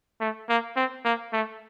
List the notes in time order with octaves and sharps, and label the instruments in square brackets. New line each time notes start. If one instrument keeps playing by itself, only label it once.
[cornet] A3
A#3
C4
A#3
A3